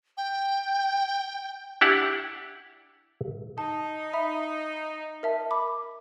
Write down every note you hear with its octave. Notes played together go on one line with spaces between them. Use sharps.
G5
D4 E4 G4 F#5
D#4 A5
E5 B5
A#4 E5 A5
B5 D6